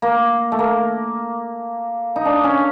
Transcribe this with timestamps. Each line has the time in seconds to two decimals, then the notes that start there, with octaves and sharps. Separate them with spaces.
0.02 A#3
0.52 A3
0.59 A#3
2.16 D#4
2.25 D4
2.44 C#4